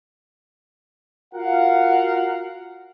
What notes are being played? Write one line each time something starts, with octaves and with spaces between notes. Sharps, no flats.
F4 F#4 A#4 F5 F#5